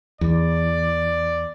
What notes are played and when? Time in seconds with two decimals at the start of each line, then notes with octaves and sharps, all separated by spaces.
0.21 E2 D5